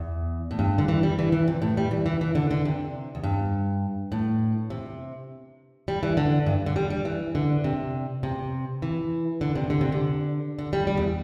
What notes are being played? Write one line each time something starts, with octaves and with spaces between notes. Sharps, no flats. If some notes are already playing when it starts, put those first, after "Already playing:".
Already playing: E2
A2
G2
D3
E3
G3
E3
E3
C3
A2
G3
E3
E3
E3
D3
D3
C3
E2
G2
A2
C3
G3
E3
D3
G2
D3
G3
G3
E3
D3
C3
C3
E3
D3
C3
D3
C3
D3
D3
G3
G3
E2